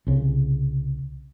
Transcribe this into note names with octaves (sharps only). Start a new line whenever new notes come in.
C2 C#3